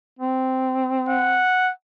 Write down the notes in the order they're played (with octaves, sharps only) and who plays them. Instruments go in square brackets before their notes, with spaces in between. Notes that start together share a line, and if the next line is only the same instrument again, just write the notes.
[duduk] C4
[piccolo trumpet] F#5